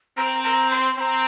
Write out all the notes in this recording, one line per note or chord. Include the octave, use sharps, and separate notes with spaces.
C4 A#5
A#5
C6
C4 A#5 C6